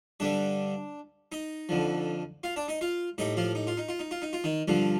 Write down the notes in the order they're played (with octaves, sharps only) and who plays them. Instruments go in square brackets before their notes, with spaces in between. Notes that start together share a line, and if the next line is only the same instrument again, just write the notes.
[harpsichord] G2 D3 G3 D4 D5
D#4 D#5
F2 D3 F3
F4 F5
D4 D5
D#4 D#5
F4 F5
A2 G3 D#4 D#5
F3 F4
D#4
F4
D#4
F4
D#4
F4
D#4
F4
D#3 D#4
G2 D3 F3 F4